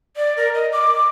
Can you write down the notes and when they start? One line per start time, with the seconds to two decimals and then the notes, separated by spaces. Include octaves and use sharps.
0.16 D5
0.37 A#4
0.54 D#5
0.73 D6